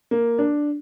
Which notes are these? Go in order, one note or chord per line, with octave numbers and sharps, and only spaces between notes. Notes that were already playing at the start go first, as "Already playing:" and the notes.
A#3
D4